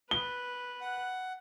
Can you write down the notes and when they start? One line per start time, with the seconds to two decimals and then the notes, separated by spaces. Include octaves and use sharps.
0.11 B4 G7
0.81 F#5